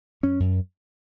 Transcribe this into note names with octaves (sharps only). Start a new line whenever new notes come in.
F#2 C#4
F#2